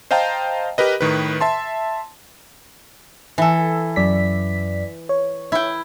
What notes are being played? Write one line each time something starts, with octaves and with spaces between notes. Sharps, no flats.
C5 D#5 F5 G5 A5 A#5
G4 A#4 B4 D#5
A2 D#3 B4
E5 A5 C6
E3 A4
F#2 D5 B6
C#5
E4 G5